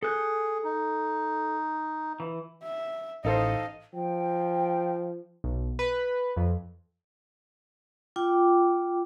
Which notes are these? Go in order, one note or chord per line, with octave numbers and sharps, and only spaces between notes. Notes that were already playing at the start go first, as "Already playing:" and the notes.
G#4 A4 F#6 G6
D#4
E3
E5
A1 D#4 A4 C5 D#5 F5
F3 G5
B1
B4
F2
F4 G5 D6